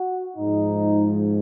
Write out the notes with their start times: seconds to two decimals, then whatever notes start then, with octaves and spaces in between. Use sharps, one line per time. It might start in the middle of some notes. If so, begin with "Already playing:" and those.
Already playing: F#4
0.37 G#2 F3 G#3 D#4